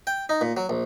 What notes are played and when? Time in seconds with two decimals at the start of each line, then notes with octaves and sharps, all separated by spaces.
0.07 G5
0.29 D#4
0.41 A#2
0.57 F#3
0.69 A#1